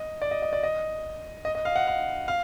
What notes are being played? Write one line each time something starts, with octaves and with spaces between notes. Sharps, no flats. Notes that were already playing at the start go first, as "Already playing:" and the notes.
Already playing: D#5
D5
D#5
D#5
D5
D#5
D#5
D#5
F5
F#5
F5
F5